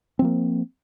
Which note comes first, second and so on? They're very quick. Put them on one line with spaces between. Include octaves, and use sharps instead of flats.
C4 F3 A#3